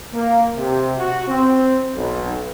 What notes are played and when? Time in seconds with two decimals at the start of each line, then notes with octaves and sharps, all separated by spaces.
0.13 A#3
0.56 C3
0.99 F#4
1.29 C4
1.96 B1